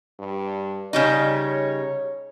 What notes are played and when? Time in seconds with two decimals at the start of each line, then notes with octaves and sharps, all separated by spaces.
0.20 G2
0.93 C#3 G3 D#4 C#5